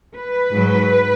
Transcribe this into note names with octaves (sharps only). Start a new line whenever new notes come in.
B4
G#2 F#3